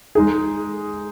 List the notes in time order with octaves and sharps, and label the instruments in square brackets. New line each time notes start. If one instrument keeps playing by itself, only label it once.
[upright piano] G#3 D#4 G#4